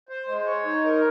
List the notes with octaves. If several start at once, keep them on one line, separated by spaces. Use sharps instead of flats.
C5
G#3
C#5
D#4
A#4